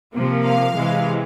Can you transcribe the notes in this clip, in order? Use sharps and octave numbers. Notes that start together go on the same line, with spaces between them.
C3 F3 A#3
F5
C3 E3 G#3